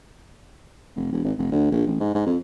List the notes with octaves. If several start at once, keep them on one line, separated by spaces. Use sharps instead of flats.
F1
E1
G#1
F1
D2
A#1
A1
G#2
G#2
F2